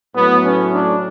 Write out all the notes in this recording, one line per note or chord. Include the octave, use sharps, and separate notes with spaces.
A2 F#3 A3 B3
C#4
D4